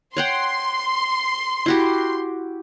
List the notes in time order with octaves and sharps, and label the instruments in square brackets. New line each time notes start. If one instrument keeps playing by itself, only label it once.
[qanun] C#5 F#5 G5 [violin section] C6
[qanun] E4 F#4 G4